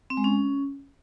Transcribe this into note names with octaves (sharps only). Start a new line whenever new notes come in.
C4
G#3
C#4